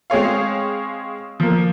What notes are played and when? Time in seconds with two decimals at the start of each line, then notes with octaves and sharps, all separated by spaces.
0.10 G#3 C4 G#4 C#5 F5
1.40 F3 A#3